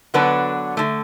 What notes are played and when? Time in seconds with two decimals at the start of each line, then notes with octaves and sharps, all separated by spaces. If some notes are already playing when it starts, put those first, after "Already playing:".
0.14 D3 F#3 B3 D4 B4
0.77 D3 A3